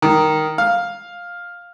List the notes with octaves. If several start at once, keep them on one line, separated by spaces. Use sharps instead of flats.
D#3
F5